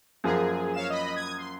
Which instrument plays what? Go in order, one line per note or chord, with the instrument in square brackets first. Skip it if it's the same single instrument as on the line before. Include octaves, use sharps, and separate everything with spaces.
[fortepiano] F#2 F3 A#3 [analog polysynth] G#4
[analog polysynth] C#5 F5 E7
D#5 B5
D#6 G#6
C6